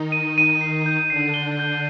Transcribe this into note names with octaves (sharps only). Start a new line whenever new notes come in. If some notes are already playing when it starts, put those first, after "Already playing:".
Already playing: D#3 D#4
D#7
D#7
C7
G6
D3 D4 C7
G7
G6